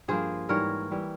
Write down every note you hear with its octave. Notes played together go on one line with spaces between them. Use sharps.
G2 F3 A#3 G#4 C5
G#2 E3 G3 A#4 C#5
E3 G3